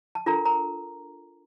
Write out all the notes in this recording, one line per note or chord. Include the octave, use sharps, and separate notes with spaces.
A5
D4 F4 A4 A#4 A#5
A#4 A#5